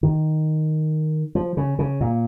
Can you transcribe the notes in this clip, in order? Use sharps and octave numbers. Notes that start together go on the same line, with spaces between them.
D#3
F3
C#3
C#3
A#2